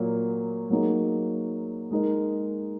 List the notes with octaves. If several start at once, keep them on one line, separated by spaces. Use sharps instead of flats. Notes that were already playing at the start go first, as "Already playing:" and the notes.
Already playing: A#2 F#3 A#3
F#3 A#3 D#4 G#4
G#3 D#4 A#4